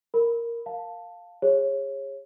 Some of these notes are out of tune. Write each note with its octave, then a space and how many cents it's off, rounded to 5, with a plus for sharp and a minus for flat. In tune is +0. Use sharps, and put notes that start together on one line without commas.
A#4 +0 B5 +0
F5 +5 A5 +5
G#4 -30 C#5 -25